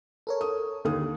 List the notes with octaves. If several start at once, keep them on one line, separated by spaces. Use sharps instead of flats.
A4 A#4 C#5
D#6
D#2 D3 D#6